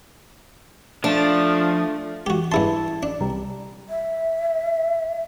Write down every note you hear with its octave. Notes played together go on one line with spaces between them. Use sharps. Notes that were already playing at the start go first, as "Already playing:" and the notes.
F3 A3 D4
E3 G#3 F#4 G4
G2 E4 G#4 E5 A5 C6
D4 D5
C2 G3 A#5
E5